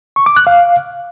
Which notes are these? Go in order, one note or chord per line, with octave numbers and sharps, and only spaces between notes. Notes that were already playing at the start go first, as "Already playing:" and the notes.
C#6
D6
F#6
F5